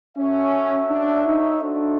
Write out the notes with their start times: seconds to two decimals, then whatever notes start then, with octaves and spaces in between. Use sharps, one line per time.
0.17 C#4 F#4 A4 C#5 E5
0.90 D4
1.26 D#4
1.62 D4 D#4 F#4 A4 C5 E5